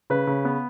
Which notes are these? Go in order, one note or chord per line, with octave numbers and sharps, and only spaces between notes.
C#3 B4
C#3
B3